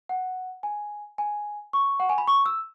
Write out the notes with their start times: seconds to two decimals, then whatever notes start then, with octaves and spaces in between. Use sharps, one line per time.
0.09 F#5
0.63 G#5
1.18 G#5
1.73 C#6
2.00 F#5
2.09 G#5
2.18 B5
2.28 C#6
2.46 E6